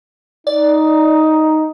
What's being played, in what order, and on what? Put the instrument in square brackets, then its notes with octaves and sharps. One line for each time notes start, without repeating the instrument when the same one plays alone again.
[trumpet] D#4 [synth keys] D5